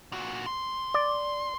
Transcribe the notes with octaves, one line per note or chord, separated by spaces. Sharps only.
A#2 F#4
C6
D5